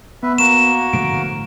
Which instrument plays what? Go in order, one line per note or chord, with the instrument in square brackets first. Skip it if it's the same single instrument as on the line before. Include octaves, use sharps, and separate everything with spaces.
[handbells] B3 [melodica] B4 E5
[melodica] A#3 F#4 A#4 [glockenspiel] E7
[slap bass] A2 D3 F3 [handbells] D7